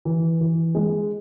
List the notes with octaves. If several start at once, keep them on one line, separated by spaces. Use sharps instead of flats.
E3
E3
G#3